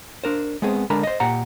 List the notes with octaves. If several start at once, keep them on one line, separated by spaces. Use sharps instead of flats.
D4 A#4 C5
G#3 B3 C4 G#4
D3 G#3 D4 A#4 A#5 B5
C5 D#5
A#2 G4 F#5 A#5